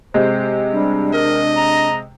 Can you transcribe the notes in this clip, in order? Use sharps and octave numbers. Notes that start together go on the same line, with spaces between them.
C3 G#3 C5
G3 D4
A#4 D#5
A#5